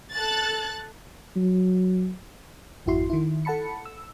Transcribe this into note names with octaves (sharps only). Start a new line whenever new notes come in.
A4 F#6 A6
F#3
G#1 F2 E4 F#4 C6
D#3 E4
A4 F#5 A5 B5 C#7
E6